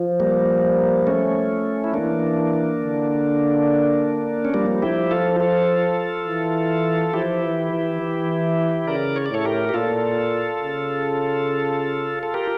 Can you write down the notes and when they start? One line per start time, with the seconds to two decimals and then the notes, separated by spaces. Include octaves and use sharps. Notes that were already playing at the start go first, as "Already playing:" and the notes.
Already playing: F3
0.20 G3 A#3
1.07 A3 C#4
1.84 E4
1.93 E3 A#3 D4
2.80 D3
4.45 C#4
4.54 F3 G3 A#3
4.82 E4 G4
5.11 F4 A4
5.40 F4 A4
6.27 E3
7.14 F3 E4 G4
7.43 E3
7.72 E3
8.00 E3
8.87 C#3 A#4 D5
9.16 C#5
9.26 D5
9.31 A2 A4 C#5
9.45 G4 A#4
9.69 G4
9.74 A#2 F4 A4
10.61 C#3
12.23 A4
12.34 G4 A#4